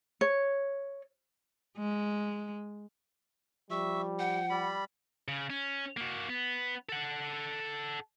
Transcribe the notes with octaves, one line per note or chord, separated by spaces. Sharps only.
C#5
G#3
F3 G3 E5 C#6
F#5 G5
G3 B5
C#3
C#4
A#3 F#4
B3
A4 F#5